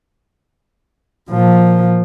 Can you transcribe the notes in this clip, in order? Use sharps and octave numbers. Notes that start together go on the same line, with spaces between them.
A#2 F3